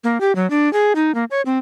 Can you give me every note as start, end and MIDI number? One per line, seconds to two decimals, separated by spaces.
0.04 0.20 58
0.21 0.35 67
0.35 0.49 54
0.50 0.71 62
0.73 0.93 68
0.95 1.14 63
1.15 1.24 58
1.31 1.42 73
1.46 1.58 60